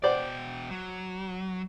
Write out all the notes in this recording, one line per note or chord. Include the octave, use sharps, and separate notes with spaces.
B2 C5 D5 F#5 G5
F#3